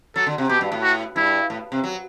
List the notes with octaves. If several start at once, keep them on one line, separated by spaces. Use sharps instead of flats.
F#3 A4
D3
C3
B2 G4
G2
A2
F#4
G2 E4
A2
C3
F#3